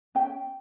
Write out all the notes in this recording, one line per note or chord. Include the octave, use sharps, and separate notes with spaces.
C#4 G5